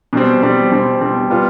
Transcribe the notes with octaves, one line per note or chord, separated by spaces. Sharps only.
B2 G3 C4
B2 G3 C4
B2 G3 C4
B2 G3 C4
G3 B3 F4